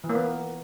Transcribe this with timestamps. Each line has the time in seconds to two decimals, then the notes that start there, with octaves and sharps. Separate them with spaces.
0.04 E3
0.09 A#3
0.15 B3